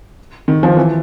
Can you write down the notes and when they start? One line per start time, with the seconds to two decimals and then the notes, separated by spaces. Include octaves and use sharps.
0.48 D#3
0.63 F3
0.77 E3